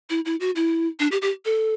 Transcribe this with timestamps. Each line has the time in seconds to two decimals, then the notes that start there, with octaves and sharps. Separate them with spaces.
0.10 E4
0.25 E4
0.40 F#4
0.56 E4
1.00 D4
1.12 G4
1.22 G4
1.45 A4